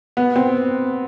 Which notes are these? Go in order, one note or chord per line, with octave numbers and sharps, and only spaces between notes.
B3
C4